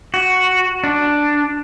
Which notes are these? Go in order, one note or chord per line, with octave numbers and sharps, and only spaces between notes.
F#4
D4